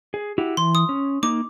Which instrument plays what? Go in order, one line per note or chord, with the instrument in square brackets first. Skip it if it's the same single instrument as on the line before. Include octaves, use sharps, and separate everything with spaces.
[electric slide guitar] G#4
E4 F#4 G4
[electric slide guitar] E3 [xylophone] C6
[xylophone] D#6
[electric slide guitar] C#4
[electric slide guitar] A#3 D#4 [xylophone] D6